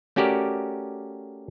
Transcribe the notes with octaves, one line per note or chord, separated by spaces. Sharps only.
A3 C#4 F#4 G4 A#4 D5